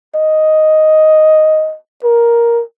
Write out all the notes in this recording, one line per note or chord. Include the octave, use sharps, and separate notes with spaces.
D#5
A#4